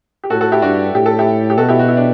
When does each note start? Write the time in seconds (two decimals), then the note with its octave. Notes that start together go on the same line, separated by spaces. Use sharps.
0.24 G4
0.30 A2 F#4 A4
0.41 F#4 A4
0.52 E4 G4
0.62 G2 D4 F#4
0.94 A2 G4
1.06 A4
1.19 E4 G4
1.50 G4
1.58 B2 F#4 A4
1.69 E4 G4
1.79 F#4
1.88 E4
1.97 D4